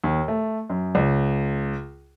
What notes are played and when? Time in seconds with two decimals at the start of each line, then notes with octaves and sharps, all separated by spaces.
0.04 D#2
0.28 A3
0.69 F#2
0.95 C#2